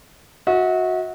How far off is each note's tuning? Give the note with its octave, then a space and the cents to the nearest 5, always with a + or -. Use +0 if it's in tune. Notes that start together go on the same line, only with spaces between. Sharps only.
F#4 -15 E5 -45